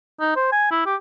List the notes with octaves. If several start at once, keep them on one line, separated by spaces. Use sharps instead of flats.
D#4
C5
G#5
E4
G4